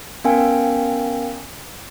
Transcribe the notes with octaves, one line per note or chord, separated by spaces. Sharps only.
B3 C#4 A#4 F5 G5 G#5